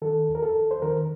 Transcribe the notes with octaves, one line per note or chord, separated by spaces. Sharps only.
D#3 A4
D#2
A#4
A4
D#2
C5
D#3 A#4